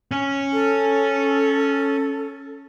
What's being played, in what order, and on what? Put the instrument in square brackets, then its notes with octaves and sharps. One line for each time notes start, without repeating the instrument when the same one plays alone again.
[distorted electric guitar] C#4
[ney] A4